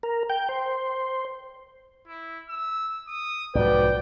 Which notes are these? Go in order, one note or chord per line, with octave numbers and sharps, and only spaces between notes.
A#4
G5
C5
E4
E6
D#6
B1 G#2 F3 F#4 B4 D5 G5